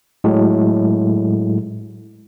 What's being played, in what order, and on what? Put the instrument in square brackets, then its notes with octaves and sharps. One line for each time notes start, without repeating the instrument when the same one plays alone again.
[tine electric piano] A2 F#3 G#3